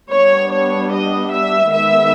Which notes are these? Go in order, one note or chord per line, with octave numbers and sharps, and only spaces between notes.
G3 B3 D4 C#5
C#5
D#5
E5
D#3 G#3 B3 E5